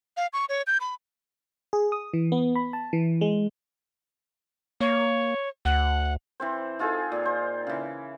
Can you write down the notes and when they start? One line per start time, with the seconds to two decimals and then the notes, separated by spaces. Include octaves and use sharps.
0.17 F5
0.33 C#6
0.49 C#5
0.67 G6
0.80 B5
1.73 G#4
1.92 D#6
2.14 E3
2.32 B3
2.55 B5
2.73 A5
2.93 E3
3.21 G#3
4.81 A#3 C#5
5.65 D2 F#5
6.40 E3 C4 C5
6.79 D#4 F4 G#4 A4
7.12 A#2
7.25 C5
7.67 C#3 E3